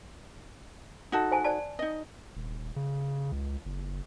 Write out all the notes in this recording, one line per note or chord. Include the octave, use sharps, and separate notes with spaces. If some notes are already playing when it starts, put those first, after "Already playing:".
D#4 F#4 A4
C5 G#5 A5
C5 D5 A5
D#4 D#5
D#1
C#3
C#2
F#1